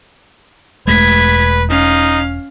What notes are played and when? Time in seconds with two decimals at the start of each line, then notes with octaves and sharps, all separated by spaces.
0.87 E1 G#3 A3 B4 G#6 B6
1.69 C#4 D#4 F5